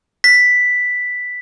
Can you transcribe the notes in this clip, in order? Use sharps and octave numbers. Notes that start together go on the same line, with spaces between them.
B6